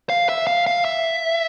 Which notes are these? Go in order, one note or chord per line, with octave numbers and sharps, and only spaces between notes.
F5
E5
F5
F5
E5